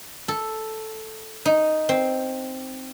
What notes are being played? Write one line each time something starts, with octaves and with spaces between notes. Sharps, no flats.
A4
D#4
C4